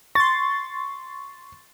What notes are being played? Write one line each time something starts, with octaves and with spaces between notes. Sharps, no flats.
C6 C#6 A6